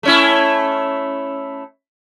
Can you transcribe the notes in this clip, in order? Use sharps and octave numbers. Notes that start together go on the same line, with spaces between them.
A3 C#4 E4